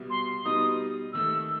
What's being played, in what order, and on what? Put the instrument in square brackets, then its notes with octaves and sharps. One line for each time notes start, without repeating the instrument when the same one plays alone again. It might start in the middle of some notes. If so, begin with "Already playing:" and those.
Already playing: [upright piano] C2 B2 G3
[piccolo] C6
[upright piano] B2 G3 D#4 [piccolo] D#6
[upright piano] D#2 D#3 A3 [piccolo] E6